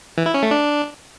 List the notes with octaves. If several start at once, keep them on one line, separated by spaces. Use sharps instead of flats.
E3
E4
C#4
A3
D4